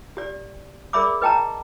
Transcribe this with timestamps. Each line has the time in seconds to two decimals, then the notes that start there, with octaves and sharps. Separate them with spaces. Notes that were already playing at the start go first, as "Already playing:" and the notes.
0.17 G4 D5
0.93 G#4 A#4 D5 E5 B5 D6
1.22 B4 D#5 G5 A5 A#5